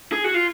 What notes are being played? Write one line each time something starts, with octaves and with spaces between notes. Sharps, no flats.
G#4
F#4
F4